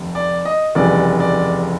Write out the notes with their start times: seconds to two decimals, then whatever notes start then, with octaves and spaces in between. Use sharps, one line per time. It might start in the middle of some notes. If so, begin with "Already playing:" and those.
Already playing: F1 D#2
0.15 D5
0.45 D#5
0.75 F1 D#2 C#3 E3 G3 D5
1.20 D5